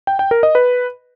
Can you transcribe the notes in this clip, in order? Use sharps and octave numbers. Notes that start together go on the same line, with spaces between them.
G5
G5
A#4
D#5
B4